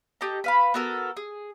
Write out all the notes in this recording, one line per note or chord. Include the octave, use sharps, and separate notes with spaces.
G4 A4 D#5 A#5
B4 F5 B5
B3 F#4 A4 A#4
G#4